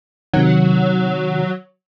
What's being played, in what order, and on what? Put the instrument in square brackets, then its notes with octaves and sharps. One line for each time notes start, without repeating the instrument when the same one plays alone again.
[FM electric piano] C3 D#3 [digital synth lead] F#3